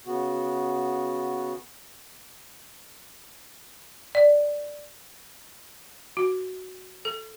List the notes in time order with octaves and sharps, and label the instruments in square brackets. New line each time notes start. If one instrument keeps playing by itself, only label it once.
[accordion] C#3 B3 F#4
[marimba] D5
[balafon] F#4
A4